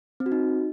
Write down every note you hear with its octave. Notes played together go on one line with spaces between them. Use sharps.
C4
F#4
D#4